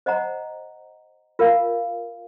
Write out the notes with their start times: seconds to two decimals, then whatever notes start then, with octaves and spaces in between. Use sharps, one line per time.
0.06 C5 D#5 F#5 A#5
1.39 F4 A#4 F5